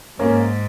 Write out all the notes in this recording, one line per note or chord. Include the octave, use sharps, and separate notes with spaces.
G#2 A#3 C#4